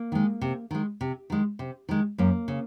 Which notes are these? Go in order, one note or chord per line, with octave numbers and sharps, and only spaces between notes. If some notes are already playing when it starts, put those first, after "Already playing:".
Already playing: A#3
D#3 G#3
C3
D#3 G#3
C3
D#3 G#3
C3
D#3 G#3
F#2 A#3
C#3